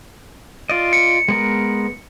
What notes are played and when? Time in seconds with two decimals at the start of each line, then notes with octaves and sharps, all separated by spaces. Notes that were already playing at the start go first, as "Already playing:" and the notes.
0.70 F4 D5 D#5
0.93 C#7
1.28 G#3 B3 A#4